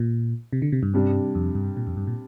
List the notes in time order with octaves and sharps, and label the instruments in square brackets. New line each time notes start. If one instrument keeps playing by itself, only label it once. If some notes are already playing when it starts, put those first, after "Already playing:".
Already playing: [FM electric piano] A#2
C3
D3
C3
G2
[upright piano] C3 G3 D4
[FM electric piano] F2
G2
A#2
F2
G2
A#2